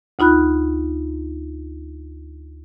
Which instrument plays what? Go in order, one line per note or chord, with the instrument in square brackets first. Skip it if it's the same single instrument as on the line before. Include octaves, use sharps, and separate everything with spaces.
[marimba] D2 D#4 F4 B5 F#6